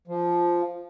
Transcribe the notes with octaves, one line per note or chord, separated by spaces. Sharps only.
F3